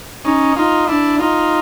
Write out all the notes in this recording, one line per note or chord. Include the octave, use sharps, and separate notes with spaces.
C#4 D#4
D#4 F4
D4 E4
D#4 F4